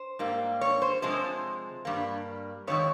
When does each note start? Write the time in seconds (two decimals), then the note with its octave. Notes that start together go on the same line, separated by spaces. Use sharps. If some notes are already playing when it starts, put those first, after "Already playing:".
Already playing: C5
0.19 G#2 G3 A#3
0.61 C#5
0.82 C5
1.02 C3 F3 G#3 C5
1.85 G2 G3 A#3
2.67 F2 D#3 G#3 C#5